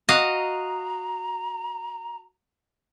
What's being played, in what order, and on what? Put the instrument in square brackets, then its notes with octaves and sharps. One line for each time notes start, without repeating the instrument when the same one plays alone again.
[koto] F#4 D#5 F5 [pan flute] A#5